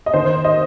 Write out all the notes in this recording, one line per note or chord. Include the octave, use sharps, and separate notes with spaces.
D#5
D#3 C5
D#5